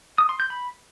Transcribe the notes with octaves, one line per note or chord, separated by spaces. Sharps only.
D#6
C6
G6
B5